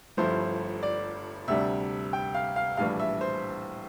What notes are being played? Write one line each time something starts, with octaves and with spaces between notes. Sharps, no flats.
G1 G2 F3 A3 E4 C5
D5
D2 C3 G3 D4 E5
G5
F5
F5
A#1 A2 E3 G3 D4 F5
E5
C5